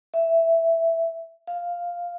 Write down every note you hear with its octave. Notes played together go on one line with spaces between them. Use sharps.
E5
F5